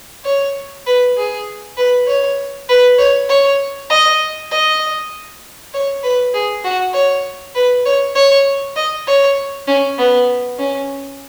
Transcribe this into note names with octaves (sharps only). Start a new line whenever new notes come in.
C#5
B4
G#4
B4
C#5
B4
C#5
C#5
D#5
D#5
C#5
B4
G#4
F#4
C#5
B4
C#5
C#5
D#5
C#5
C#4
B3
C#4